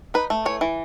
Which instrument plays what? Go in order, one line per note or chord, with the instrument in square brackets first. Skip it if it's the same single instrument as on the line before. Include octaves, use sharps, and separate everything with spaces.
[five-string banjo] D#4 B4
A3
E3 C#5
E3